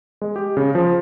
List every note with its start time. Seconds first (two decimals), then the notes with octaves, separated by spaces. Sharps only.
0.22 G#3
0.36 G4
0.57 C#3
0.75 F3